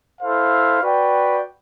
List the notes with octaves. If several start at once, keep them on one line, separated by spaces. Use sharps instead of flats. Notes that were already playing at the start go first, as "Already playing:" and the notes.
E4 A4 C5 F5
F#4 B4 D5 G5